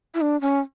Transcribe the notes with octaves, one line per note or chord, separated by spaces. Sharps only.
E4
D4
C#4